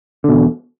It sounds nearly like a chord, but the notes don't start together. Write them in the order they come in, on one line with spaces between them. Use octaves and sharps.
D3 B2 E2